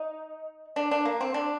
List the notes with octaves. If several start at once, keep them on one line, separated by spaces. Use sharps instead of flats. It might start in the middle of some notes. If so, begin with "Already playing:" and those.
Already playing: D#4
D4
D4
A#3
C4
D4